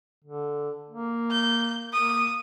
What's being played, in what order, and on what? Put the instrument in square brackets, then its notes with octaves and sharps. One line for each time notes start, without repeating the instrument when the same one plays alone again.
[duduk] D3
A#3
[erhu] G6
[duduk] A#3 [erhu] D#6